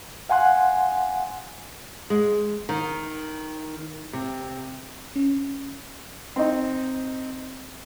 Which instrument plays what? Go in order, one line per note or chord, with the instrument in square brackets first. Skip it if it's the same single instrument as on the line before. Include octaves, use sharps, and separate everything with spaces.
[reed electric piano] F5 F#5 G#5 C6 F#6
[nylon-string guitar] G#3
D#3
C3
[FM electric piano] C#4
[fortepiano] C4 D#4